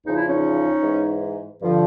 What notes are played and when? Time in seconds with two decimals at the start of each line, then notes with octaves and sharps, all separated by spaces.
0.06 E2 C#3 F3 D#4
0.16 E4
0.27 C#4 D#4
0.83 G#2 E3
1.61 G2 D3 F3